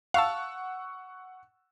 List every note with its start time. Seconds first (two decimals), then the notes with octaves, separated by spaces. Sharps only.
0.14 F5 F#5 A5 C#6 E6